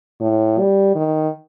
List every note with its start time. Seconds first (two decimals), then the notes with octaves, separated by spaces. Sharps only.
0.21 A2
0.59 G3
0.95 D#3